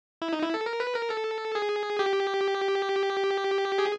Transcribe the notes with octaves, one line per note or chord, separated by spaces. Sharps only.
E4
D#4
E4
A4
A#4
B4
A#4
A4
G#4
G4
G#4